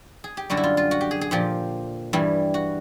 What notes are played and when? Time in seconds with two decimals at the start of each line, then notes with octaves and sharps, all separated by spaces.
0.24 G#4
0.37 G4
0.50 F#2 D3 G3 F#4
0.57 E4
0.64 F4
0.77 F4
0.91 F#4
1.01 G4
1.11 G#4
1.21 G#4
1.31 A#2 F3 G4
2.13 G2 E3 G3
2.54 F#4